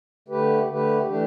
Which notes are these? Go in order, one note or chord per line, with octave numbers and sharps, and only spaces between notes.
D3 A3 G4 B4
D3 A3 G4 B4
E3 A3 D4 G4